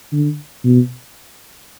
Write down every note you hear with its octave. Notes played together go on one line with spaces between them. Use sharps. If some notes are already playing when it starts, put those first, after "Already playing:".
D3
B2